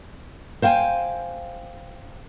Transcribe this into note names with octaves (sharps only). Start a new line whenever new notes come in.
C5 F5 G5 G#5